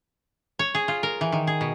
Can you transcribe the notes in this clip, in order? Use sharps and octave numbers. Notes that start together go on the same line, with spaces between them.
C#5
G#4
F4
A#4
E3
D#3
G#4
B2